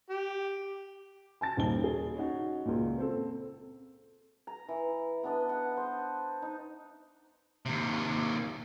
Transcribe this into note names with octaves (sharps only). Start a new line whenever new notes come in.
G4
G#5 A5 A6
D#1 D#2 D#4 G7
C#4 G#4
C#4 D#4 F#4
C#2 A#2
C4 A4
A#5
E3
B3 D4 D#5
F#5
C5
D#4
D#2 C3